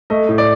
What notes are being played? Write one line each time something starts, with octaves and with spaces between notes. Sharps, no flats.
A3 D#5
A2
D5